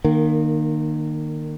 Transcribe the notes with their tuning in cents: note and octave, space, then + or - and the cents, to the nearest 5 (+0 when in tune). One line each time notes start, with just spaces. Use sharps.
D#3 -25 A#3 +0